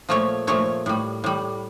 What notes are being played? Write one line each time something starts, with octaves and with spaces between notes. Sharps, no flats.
A#2 F3 A3 C#5
A#2 F3 A3 C#5
A2 G3
A2 G3